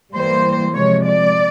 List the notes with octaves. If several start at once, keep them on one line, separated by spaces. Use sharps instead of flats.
E3 G3 A#3 C5
C3 F3 G#3 C#5
D5